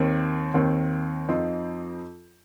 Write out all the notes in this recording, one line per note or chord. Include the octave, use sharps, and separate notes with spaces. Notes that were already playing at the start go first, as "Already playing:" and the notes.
Already playing: D#2 D#3 C4
D#2 D#3 C4
F2 F3 C4 D#4